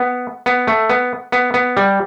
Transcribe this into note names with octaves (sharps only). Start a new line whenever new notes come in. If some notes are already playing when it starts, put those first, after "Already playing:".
Already playing: B3
B3
A3
B3
B3
B3
G3